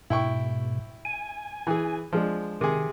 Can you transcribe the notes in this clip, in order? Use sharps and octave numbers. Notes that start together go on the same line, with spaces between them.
G#2 B2 E4 G5 C#6
G#5
E3 G#4
F3 G#3 D4
C3 D#3 G#4